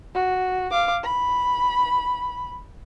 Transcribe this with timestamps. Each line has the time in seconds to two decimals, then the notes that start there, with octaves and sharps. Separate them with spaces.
0.15 F#4
0.71 F5 D6
1.03 B5